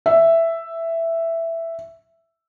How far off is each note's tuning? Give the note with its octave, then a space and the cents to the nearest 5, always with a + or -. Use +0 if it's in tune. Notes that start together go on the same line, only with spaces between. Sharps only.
E5 +5